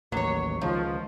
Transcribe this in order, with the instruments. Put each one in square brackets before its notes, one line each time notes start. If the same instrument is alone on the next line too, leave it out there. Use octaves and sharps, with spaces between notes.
[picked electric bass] A1 D#2 [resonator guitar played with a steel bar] F#3 C#5
[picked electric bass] C#2 [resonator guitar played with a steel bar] D#3 [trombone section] F3